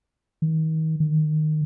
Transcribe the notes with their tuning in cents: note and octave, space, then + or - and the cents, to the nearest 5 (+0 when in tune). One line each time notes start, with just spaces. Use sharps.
D#3 +35
D#3 -15